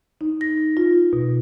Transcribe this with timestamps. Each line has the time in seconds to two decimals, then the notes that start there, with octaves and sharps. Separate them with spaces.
0.21 D#4
0.41 A#6
0.77 F4
1.13 B2